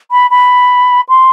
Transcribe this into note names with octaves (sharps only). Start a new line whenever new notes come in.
B5
B5
C6